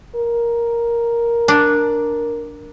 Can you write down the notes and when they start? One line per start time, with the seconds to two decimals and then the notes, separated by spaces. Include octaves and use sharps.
0.15 A#4
1.48 D4